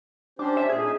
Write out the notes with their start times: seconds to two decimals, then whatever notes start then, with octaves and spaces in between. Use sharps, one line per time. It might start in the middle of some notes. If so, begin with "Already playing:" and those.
0.39 C#4 D4 G4 C5
0.57 E5
0.69 A#2 G#4
0.83 C#4 D#4